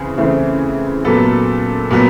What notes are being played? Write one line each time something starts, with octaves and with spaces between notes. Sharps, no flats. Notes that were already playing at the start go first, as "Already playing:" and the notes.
Already playing: C#3 E3 C4 G#4
C#3 E3 A3 C4
A#2 F#3 B3 A4
A#2 F#3 B3